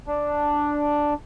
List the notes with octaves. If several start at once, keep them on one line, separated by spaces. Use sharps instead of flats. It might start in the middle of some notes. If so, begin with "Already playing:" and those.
D4